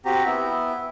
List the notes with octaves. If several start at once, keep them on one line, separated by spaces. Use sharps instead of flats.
C4 F#4 G4 A#5
B3 E4